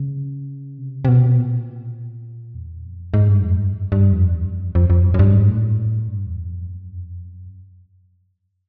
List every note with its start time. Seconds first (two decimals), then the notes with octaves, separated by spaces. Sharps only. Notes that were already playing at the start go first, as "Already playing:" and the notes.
Already playing: C#3
0.78 C3
1.05 C3
1.08 B2
1.38 A#2
2.54 E2
2.84 F2
3.14 G#2
3.29 G2
3.42 F2
3.58 G2
3.92 G2
4.12 F2
4.31 E2
4.45 F#2
4.60 F2
4.75 F2
4.90 F2
5.04 F#2
5.14 F#2
5.19 G2
5.33 G#2
5.48 A2
6.08 G2
6.26 E2
6.46 F2
6.66 F#2
6.95 F2
7.25 F#2